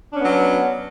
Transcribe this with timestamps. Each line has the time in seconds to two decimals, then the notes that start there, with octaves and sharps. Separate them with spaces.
0.11 D4
0.16 C#4
0.20 B3
0.24 F#3